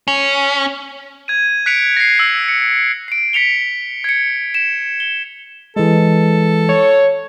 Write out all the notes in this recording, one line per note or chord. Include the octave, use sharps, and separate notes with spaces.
C#4
G#6 D#7
F#6 B6 C#7 D7 F7
A#6 C7
E6
C#7
C7 D7
B6 C#7 F7 G7
G#6 C#7
E7
G7
E3 G#3 A4
C#5